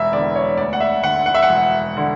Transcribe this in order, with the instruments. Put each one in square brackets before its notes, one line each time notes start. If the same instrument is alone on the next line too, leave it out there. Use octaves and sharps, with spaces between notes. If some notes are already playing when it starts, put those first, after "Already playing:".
Already playing: [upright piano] E1 E5
E2 D3 D5
C#5
D2 D5
F#5
E5
D3 F#5
F#5
E5
F#5
E1
D3